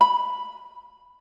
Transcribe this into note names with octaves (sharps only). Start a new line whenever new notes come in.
B5